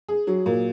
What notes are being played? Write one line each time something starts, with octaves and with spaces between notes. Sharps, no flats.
G#4
F#3
A#2